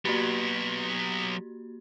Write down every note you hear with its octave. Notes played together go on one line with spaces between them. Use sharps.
F#3 A#3 B3 F#4 G4